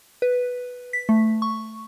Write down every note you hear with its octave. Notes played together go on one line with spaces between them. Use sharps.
B4
B6
A3
C#6